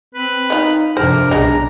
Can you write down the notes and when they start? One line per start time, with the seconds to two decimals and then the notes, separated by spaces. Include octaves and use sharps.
0.15 C4 B4
0.50 D#3 D#4 F4
0.97 F2 C3 D4 A#4 C5
1.31 B1 G#3 C#4 A#5